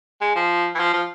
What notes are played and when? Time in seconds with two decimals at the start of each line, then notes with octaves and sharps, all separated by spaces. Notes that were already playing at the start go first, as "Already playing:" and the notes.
0.21 G#3
0.36 F3
0.75 E3
0.79 F3
0.93 F3